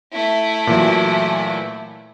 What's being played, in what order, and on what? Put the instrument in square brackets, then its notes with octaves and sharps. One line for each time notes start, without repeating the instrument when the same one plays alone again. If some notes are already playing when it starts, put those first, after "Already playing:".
[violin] A3 E4
[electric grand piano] A#2 E3 F#3